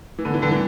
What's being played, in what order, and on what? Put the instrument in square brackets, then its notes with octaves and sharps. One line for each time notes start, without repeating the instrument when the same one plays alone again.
[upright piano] E3
[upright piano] D3 [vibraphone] B3
[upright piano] E3
[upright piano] D3 [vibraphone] G3
[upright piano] E3